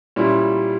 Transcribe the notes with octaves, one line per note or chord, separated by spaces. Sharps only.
A#2 G3 C#4 E4